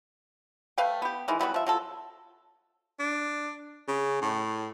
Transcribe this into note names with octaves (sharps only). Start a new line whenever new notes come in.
A3 B4 F5 G5
B3 G4
D#3 E3 G#3
F#3 G3 B3 F#4
F3 E5
F#3 F4 A4
D4
C#3
A2